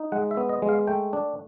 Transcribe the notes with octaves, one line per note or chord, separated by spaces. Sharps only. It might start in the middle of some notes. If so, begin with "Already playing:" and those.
Already playing: D#4
G#3 F#5
E5
B3
D#5
G#3
F5
A3 G5
D4